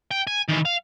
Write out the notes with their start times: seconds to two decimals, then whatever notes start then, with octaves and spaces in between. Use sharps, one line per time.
0.11 G5
0.27 G#5
0.49 D#3 E3
0.65 F5